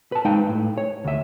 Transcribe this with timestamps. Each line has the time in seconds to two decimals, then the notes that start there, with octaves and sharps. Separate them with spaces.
0.12 B4 A5
0.25 G#3 D#4 B4 F5 G5
0.49 A2
0.78 C#5
1.04 D2 E5